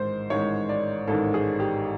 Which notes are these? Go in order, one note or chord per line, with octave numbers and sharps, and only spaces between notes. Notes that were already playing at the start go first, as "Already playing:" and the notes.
Already playing: A1 G#2 D#3 G#3 C5
A1 G#2 D#3 G#3 C#5
D5
A1 G#2 D#3 G#3 A4
G#4
G4